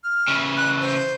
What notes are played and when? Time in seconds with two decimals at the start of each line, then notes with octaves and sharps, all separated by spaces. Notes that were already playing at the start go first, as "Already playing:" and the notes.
0.04 F6
0.28 C#3 E3
0.57 F#6
0.80 C5